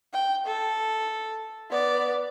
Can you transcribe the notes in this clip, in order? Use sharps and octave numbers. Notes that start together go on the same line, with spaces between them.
G5
A4
B3 D5